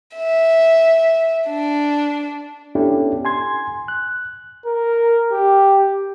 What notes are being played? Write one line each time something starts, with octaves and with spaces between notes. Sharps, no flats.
E5
D4
B3 C#4 D4 E4 G4 A4
G#5 C6 G#6
F#6
A#4
G4